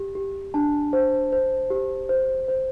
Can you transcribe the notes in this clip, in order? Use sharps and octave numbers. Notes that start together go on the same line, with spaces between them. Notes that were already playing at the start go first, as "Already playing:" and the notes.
Already playing: G4
G4
D4 A5
C5
C5
G4
C5
C5